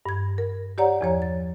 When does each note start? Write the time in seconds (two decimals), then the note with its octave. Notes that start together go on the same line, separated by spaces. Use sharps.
0.06 G2 G#6
0.38 A#4
0.78 G4 C#5 D5 F#5 A#5
1.01 E2 F3 C#5 A#5
1.22 A6